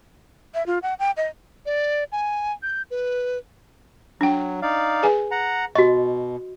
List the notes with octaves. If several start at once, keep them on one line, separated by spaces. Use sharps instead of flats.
E5
F4
F#5
G5
D#5
D5
G#5
G6
B4
F#3 D4 G5
D#4 D5 F5
G#4 B4 G#5
F#5 A#5
B2 F#4 D#5 C#6